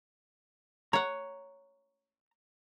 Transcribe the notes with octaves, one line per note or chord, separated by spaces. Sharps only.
C#5 F#5 A#5